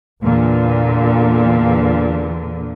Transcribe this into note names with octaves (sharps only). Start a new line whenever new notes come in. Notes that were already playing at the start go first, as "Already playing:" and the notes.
E2 A#2 D3